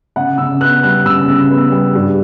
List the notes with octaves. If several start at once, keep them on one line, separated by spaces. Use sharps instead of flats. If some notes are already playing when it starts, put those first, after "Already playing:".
C#3 F#5
C#3 E6
B3 F#6
G3 F#6
C#3 E6
C#3
B3
G3
G2